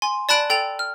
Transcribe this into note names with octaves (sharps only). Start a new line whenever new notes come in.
G#5 C6
D5 A5 B5 F#6 D7 F#7
A4 G5 A6 F7
F6